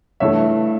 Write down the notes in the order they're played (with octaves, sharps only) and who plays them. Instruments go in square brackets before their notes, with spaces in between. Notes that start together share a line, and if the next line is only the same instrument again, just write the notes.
[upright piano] G2 E3 A3 C#5 E5